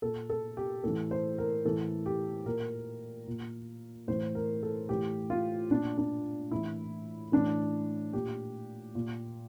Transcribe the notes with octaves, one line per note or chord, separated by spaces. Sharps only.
A#2 A4
A4
G4
A2 E3 A4
C5
A#4
A2 E3 A4
G4
A#2 A#4
A#2
A2 E3 C5
A#4
A4
A2 E3 G4
F4
A#2 D4
D4
A2 E3 E4
A2 E3 D4
A#2 G4
A#2